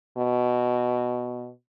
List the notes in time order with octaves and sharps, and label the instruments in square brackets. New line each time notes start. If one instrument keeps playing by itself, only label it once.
[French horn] B2